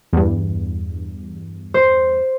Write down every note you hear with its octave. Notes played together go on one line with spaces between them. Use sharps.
E2 G2
C5